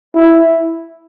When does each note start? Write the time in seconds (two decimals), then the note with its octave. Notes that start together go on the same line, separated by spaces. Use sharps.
0.15 E4